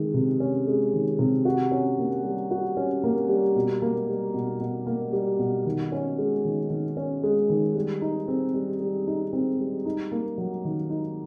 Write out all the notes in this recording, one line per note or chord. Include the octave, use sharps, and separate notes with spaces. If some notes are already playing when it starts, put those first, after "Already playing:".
Already playing: D#3 G#3
C3
C#4
G#3
D#3
C3
F#4
C#4
A#3
G3
F#4
C#4
A#3
G3
B2
A#3
G3
B2
B2
A#3
G3
B2
D#3
C#4
G#3
D#3
D#3
C#4
G#3
D#3
G3
D#4
C4
G3
G3
D#4
C4
G3
D#4
A#3
F#3
D#3
D#4